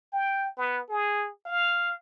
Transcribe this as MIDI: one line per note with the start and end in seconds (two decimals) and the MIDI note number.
0.12 0.50 79
0.57 0.81 59
0.89 1.29 68
1.46 1.93 77